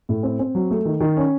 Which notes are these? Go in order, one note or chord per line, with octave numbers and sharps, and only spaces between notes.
A2
C4
C4
F#3
A3
D#3
D#3
C#4